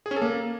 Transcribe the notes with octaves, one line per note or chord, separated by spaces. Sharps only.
G#4
C#4
A4
A#3